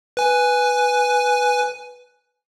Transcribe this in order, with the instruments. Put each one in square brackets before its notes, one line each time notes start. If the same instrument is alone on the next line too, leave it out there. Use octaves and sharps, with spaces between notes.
[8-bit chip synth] B4 G#5